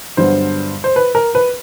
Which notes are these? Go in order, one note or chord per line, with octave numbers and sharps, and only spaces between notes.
G2 D3 F#3 B3 C5
C5
B4
A#4
B4